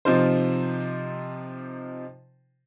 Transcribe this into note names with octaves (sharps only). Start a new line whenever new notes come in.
C3 F3 D#4 F4 C5